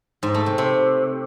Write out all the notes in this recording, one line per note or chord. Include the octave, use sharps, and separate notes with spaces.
G#2
A3
C3
C3